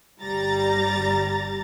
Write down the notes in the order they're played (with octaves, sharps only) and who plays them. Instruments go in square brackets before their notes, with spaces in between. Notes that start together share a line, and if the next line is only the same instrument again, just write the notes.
[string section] G1 G3 A#5 A6